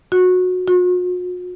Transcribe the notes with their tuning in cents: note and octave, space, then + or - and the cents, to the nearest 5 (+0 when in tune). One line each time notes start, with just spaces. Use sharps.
F#4 -20
F#4 -45